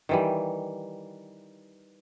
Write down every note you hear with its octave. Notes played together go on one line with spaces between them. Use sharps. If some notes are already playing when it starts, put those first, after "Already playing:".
D#3 E3 G3